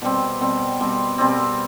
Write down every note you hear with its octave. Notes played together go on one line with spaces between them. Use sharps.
B2 G3 C4
B2 G3 C4
B2 G3 C4
B2 G3 C4